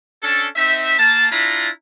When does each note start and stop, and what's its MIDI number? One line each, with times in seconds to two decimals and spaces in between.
0.23 0.47 61
0.23 0.47 62
0.23 0.47 69
0.57 0.95 60
0.57 0.95 63
0.57 0.95 76
0.99 1.28 58
0.99 1.28 81
1.31 1.69 62
1.31 1.69 64
1.31 1.69 65
1.31 1.69 82
1.31 1.69 83